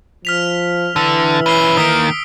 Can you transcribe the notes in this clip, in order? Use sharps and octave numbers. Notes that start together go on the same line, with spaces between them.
F3 F6 B6 F7
D3 E3 E6
C#4 B4 C7 G7
D#3 A#3 D#6 B6 D7